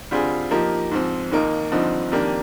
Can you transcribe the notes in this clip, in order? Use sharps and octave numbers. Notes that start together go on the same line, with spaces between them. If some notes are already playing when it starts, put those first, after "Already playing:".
D3 G3 C4 F4 G#4
F3 A#3 D#4 G4
G#2 F3 C4
D#2 D#3 A#3 D#4
G2 D3 F3 C4 D#4
F2 D#3 A#3 D4 G4